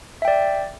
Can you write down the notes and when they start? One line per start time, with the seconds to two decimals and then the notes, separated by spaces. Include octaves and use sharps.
0.22 E5
0.25 G5
0.28 D5